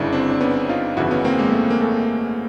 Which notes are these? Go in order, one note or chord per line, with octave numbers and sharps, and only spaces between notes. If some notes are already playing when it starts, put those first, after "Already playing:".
Already playing: G1 F#2 C#3 D4 E4
C4 D4
D4
B3 C#4
D#4 F4
G1 F2 C#3 E3 E4 F#4
B3 C#4
A#3 C4
G#3 A#3
A3
A#3
A3